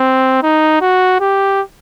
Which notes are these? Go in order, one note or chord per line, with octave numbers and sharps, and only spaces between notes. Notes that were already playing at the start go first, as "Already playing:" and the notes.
Already playing: C4
D#4
F#4
G4